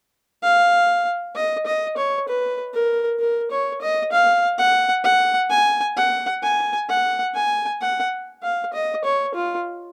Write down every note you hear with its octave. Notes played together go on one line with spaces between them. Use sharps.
F5
D#5
D#5
C#5
B4
A#4
A#4
C#5
D#5
F5
F#5
F#5
G#5
F#5
G#5
F#5
G#5
F#5
F5
D#5
C#5
F4